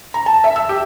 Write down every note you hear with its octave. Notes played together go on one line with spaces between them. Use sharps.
A#5
A5
E5
E6
G4